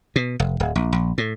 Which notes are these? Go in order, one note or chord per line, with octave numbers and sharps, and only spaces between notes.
B2
F1
D1
A#1
A#1
A2